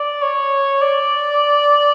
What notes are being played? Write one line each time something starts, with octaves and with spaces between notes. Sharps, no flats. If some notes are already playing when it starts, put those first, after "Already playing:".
Already playing: D5
C#5
D5